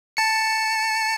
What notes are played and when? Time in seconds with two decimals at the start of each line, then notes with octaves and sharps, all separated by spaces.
0.17 A5 C#7